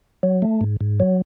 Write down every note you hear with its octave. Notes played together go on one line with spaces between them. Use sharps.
F#3
A3
G#2
G#2
F#3